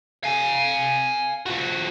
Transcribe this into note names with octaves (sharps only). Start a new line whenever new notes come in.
F5 G#5
F3 F#4